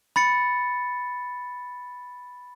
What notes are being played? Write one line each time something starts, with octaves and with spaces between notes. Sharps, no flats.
B5 A6 C#7